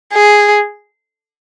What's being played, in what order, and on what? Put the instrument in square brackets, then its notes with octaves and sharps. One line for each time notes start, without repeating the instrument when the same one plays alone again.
[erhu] G#4